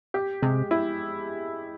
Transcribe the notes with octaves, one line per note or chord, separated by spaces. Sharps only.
G4
C3 G#3
E4